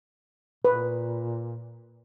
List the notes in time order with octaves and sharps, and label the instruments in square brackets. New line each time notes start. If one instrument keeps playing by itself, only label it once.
[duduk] A#2 [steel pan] B4